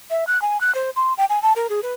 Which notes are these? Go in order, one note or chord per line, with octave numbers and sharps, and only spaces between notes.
E5
F#6
G#5
F#6
C5
C6
G5
G#5
A5
A#4
G#4
B4